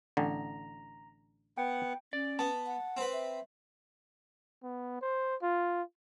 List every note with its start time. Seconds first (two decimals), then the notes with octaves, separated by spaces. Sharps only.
0.17 A1 D3 A#5
1.58 B3 F#5 G5
2.13 C#4 D5
2.39 B3 A5
2.66 F#5
2.97 C4 B4
3.13 E5
4.63 B3
5.02 C5
5.42 F4